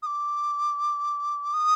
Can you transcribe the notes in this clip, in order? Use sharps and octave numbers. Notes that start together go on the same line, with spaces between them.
D#6
D6
D#6